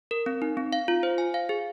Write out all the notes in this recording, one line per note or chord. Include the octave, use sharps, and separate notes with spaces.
A#4
C4
D#4
C4
F5
F4
C5
G#5
F5
G#4